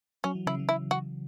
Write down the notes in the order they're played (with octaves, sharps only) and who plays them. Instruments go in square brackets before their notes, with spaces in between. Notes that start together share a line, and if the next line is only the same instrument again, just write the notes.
[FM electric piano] F#3 [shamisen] C#4
[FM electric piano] E3
[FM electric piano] C#3 [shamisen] E4
[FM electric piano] E3
[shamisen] E4
F#4